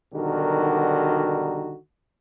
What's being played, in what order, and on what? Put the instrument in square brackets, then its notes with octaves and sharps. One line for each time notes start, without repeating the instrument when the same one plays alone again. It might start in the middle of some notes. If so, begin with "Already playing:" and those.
[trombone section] B1 D3 D#3 G3 F#4 A#4